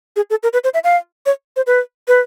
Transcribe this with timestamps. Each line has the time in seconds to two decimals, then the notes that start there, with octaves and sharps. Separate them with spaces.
0.16 G#4
0.30 A4
0.43 A#4
0.53 B4
0.64 C5
0.74 E5
0.84 F5
1.26 C#5
1.56 C5
1.67 B4
2.08 B4